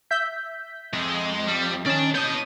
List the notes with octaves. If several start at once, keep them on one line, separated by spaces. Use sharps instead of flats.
E5 G6 B6
F2 G#3
G3
D#3 C#4 D5 A5
B3 C#5 D#5 A5 G6